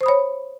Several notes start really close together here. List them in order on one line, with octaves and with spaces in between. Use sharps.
C5 D#6 B5 C#5